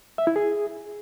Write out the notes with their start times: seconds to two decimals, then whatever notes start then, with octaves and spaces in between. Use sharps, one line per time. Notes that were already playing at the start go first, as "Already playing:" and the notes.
0.18 E5
0.27 E4
0.36 G#4